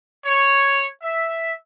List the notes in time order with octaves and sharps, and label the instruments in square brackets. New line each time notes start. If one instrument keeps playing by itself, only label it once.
[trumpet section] C#5
E5